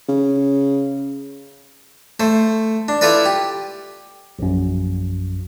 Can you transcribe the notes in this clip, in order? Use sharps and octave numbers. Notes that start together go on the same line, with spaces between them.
C#3
A3 C5
D4
E4 F4 A4 B4 D5
G4
A#1 F#2